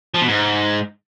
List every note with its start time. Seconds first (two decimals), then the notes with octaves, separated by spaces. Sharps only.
0.15 F3
0.21 B2
0.28 G#2